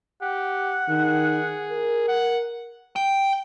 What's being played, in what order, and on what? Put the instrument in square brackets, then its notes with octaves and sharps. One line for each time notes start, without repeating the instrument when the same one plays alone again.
[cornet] G4 [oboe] F#5
[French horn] D#3 [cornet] G#4
[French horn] A#4
[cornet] F#5
[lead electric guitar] G5